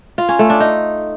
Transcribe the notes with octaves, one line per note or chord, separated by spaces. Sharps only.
F4
C#4
A3
D4
D#4